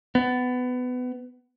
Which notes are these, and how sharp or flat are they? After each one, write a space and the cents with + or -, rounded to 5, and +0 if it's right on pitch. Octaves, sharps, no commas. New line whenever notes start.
B3 +20